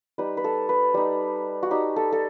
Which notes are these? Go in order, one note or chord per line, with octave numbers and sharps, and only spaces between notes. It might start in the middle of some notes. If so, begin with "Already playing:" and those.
G3 D#4 B4
B4
A4
B4
G3 D#4
F#4
G3 D#4 G4
A4
A4